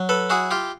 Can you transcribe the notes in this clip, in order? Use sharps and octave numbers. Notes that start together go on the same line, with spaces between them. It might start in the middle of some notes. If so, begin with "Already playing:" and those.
Already playing: F#3
A4 B4
E4 F#4 G#4
F4 G4